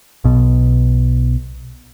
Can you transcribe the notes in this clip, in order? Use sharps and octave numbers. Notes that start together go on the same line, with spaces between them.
B1 B2